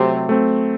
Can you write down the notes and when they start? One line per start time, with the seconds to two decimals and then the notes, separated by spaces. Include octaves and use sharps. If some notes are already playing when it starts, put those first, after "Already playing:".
Already playing: C3 F#3 A3 C4
0.29 A3 C4